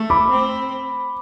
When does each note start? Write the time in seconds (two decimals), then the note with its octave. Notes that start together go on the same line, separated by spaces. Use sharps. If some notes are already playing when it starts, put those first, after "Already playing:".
Already playing: A3
0.10 B5 D6
0.30 C4